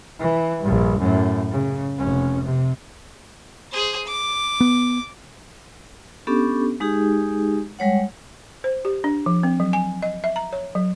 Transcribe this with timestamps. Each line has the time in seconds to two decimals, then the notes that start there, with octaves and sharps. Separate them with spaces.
0.19 E3
0.62 A#1 G2
0.99 F#2 A2
1.51 C#3
1.98 F1 C#4
2.44 C3
3.71 G#4 C5
4.06 D6
4.61 B3
6.27 B3 C#4 D4 G4 A4
6.80 G#3 D#4 G4 G#4
7.79 G3 G#3 C#5 F#5
8.64 C5
8.85 G4
9.04 D4
9.26 F3
9.43 C4
9.60 F#3
9.73 G#5
10.02 D#5
10.24 E5
10.36 A#5
10.53 C#5
10.75 F#3